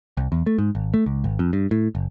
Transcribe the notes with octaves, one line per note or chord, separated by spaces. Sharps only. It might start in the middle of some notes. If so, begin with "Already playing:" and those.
C2
E2
A3
G#2
G#1
A3
C#2
G#1
F2
G2
A2
F#1